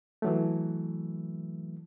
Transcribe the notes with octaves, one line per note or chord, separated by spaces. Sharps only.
E3 F#3 A3